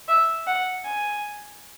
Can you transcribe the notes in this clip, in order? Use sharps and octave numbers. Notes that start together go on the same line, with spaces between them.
E5
F#5
G#5